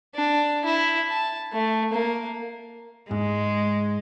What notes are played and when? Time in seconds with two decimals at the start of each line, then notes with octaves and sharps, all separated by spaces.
0.15 D4
0.65 E4
1.09 A5
1.52 A3
1.93 A#3
3.11 G#2 G#3